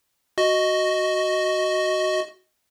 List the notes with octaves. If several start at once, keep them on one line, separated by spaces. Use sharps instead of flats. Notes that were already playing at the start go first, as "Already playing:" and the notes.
F#4 D#5